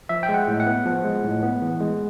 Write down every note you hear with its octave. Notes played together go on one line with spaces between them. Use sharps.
F3 E5
G5
G#3
F#5
A2
F#5
B3
F3
G#3
A2
B3
E3
G#3